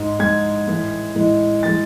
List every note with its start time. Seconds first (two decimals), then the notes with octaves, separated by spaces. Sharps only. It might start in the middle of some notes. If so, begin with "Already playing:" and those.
Already playing: G#2 G#3
0.19 G#2 G#3 G#6
0.67 A2 E3 G#3
1.15 A2 E3 G#3
1.63 E3 G#3 A6